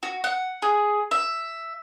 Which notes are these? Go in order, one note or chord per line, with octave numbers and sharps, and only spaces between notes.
F#4
F#5
G#4
E5